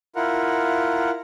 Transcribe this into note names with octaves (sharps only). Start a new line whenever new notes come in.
E4 F4 A#4 F#5